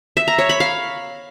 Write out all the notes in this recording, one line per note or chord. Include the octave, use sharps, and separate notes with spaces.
E5
A#5
C#5
B5
F5